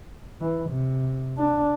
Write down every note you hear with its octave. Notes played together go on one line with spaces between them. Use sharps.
E3
C3
D4